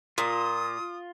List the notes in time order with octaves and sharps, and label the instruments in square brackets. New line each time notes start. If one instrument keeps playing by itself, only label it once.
[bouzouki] A#2 [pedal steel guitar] F4 [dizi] D#6